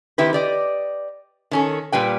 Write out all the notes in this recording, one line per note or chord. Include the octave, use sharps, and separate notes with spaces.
D#3 C4 E4 G4 B4
G4 D5 D#5
D#3 C#4 A4
A#2 G3 B4 G5